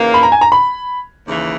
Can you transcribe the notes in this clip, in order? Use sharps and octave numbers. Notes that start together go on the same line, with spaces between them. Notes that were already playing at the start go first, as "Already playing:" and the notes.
Already playing: D#2 C#3 E3 A#3
B5
A#5
G#5
A#5
B5
D#2 C#3 E3